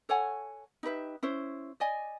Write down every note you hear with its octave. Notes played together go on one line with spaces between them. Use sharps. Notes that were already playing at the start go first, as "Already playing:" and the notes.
A4 C#5 F#5 G#5
D#4 G4 B4 E5
C#4 E4 C5
D5 D#5 G#5